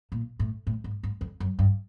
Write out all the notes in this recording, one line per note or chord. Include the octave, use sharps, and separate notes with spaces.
A#2
A2
A2
G#2
G#2
F2
F#2
G2